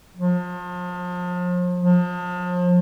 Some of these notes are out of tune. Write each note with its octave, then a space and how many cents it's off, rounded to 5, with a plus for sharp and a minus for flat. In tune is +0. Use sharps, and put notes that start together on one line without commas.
F3 +35
F3 +35